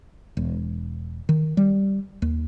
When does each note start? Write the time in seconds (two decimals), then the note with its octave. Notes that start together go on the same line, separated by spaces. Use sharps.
0.37 E1
1.29 D#3
1.57 G3
2.22 D#2